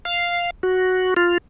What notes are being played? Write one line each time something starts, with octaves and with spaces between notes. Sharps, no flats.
F5
F#4
F4